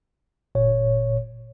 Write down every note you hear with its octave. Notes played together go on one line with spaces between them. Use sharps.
G1 A#2 C#5